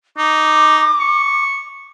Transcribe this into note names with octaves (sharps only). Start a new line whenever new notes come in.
D#4 D6
C#6